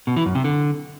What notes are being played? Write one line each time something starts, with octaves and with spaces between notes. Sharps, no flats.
B2
E3
F#2
C3
D3